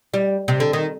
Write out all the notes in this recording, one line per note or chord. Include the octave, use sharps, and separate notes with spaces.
G3
C3
D3
D#3